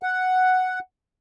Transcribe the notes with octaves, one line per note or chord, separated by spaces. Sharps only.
F#5